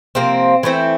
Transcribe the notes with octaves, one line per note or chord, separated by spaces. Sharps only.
C3 F3 A#3 C4
E3 A3 C4